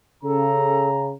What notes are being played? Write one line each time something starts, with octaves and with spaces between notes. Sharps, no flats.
C#3 A4 A#5